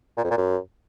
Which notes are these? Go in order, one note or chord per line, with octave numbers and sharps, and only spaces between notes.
A#2
F2
A#2
F#2